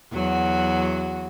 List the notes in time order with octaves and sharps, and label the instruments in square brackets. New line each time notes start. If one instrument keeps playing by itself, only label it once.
[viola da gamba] E2 F#3 F#4